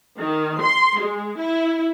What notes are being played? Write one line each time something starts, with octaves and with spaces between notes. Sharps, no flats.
D#3
C6
G#3
E4